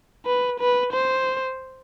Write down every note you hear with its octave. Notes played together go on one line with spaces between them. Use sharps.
B4
B4
C5